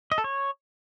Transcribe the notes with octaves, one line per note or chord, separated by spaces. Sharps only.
D#5
A4
C#5